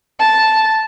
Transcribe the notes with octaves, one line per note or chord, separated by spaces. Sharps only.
A5